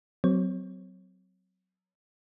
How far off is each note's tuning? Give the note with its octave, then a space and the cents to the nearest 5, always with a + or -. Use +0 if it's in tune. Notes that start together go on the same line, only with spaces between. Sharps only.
F#3 +10 C4 -30 C#5 -25